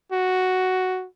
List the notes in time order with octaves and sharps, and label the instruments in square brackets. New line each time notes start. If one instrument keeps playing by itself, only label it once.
[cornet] F#4